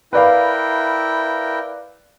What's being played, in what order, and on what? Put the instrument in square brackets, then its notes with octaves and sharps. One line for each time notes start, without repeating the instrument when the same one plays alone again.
[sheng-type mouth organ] E4 A#4 G5 [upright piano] B4 D5 F5